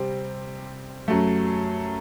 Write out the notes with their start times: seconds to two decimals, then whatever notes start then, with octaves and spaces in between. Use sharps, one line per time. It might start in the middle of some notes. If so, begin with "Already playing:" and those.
Already playing: C3 G3 C4 G4
1.08 F#2 F#3 A3